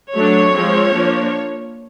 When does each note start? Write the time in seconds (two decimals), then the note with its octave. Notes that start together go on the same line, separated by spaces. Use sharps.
0.15 F#3 A3 D4 C#5
0.54 F3 G#3 C4
0.94 F3 A#3 D4